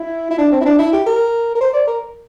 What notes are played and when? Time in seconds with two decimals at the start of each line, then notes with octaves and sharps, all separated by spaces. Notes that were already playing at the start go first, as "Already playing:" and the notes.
Already playing: E4
0.31 E4
0.38 D4
0.52 C4
0.61 E4
0.65 D4
0.79 E4
0.93 G4
1.06 A#4
1.55 A#4
1.61 C5
1.74 D5
1.88 A#4